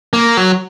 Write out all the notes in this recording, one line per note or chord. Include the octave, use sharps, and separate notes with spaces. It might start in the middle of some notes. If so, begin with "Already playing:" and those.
A#3
F#3